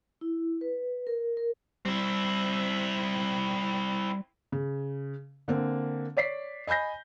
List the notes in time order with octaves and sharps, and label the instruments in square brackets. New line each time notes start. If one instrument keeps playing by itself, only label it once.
[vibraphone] E4
B4
A#4
A#4
[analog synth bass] G3 [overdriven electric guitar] C4 E4
[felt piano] C#3
D3 A#3 C4
C#5 D5 B6 C7
D#5 G#5 B5 G6 A#6